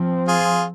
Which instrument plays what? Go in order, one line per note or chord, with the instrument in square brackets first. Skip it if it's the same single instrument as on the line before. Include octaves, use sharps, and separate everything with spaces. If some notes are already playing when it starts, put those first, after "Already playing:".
Already playing: [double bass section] F3 C4
[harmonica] F4 G#4